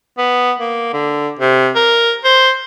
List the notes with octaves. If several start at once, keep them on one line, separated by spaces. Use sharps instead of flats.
B3
A#3
D3
C3
A#4
C5